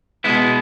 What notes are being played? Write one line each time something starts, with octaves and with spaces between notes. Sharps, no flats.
B2 G#3 B3 E4